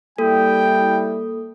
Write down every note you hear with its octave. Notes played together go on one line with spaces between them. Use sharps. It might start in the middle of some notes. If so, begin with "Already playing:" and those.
G3 A#3 E4 A4 G5